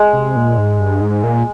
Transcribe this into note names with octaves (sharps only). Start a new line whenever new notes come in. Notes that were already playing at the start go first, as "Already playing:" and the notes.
Already playing: G#3
C3
A#2
G#2
G2
G#2
A#2